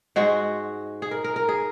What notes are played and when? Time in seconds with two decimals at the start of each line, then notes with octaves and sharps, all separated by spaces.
0.16 G#2 G#3 F#4
1.02 G#4
1.11 A#4
1.24 A#4
1.36 A#4
1.49 G#4